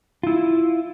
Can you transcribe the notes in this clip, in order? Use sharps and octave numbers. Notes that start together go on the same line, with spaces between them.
E4 F4